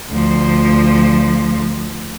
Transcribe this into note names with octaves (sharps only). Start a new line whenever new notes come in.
D2 F3